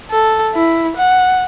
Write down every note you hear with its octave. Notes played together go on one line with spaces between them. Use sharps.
A4
E4
F#5